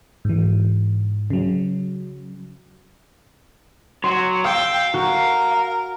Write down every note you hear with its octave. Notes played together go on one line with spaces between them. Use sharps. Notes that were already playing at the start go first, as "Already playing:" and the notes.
G#2 E3
C#3 F#3
F#3 C6
F5 G5 E6
F#4 A#4